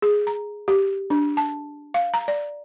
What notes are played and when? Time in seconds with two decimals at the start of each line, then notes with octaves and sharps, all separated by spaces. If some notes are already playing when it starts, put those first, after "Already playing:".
0.02 G#4
0.27 A#5
0.68 G4
1.10 D4
1.37 A5
1.94 F5
2.14 A#5
2.28 D5